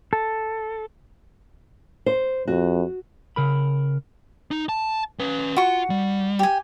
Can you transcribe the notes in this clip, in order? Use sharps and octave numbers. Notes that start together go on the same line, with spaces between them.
A4
C5
F2 F#4
C#3 A#4 B5
D#4
A5
C#4 B4
F4 F#4 C#6
G3
G4 G#5